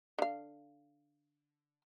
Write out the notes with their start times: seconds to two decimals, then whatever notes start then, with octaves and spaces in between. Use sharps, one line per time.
0.19 D3 F5